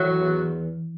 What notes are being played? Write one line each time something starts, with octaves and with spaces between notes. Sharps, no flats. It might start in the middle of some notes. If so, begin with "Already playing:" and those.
Already playing: A2 E3 F#3
E2